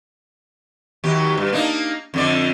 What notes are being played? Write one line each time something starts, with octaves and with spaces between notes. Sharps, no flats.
D#2 F#3 G4
G2
A#3 D4 D#4
F2 D3 D5